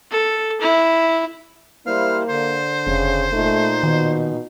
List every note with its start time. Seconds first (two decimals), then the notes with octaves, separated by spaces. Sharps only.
0.11 A4
0.61 E4
1.87 G3 A#3 E4 C5 F5
2.29 D3 C5
2.87 F1 C#3
3.33 A#2 A3 D#4
3.83 B2 D#3